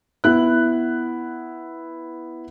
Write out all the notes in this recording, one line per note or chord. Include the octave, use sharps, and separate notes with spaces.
B3 E4 F#6